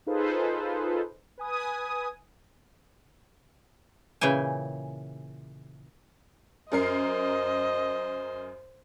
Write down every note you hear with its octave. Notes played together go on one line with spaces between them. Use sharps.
D#4 F4 G#4 A4 B4 C5
B4 G#5 D#6
A#2 C#3 E3 G5 G#5
F#2 A#4 C5 D#5 C7